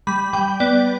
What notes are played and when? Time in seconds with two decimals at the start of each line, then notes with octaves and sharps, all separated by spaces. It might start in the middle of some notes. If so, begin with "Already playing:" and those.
0.07 G3 B5
0.33 G3 G5
0.60 B3 D5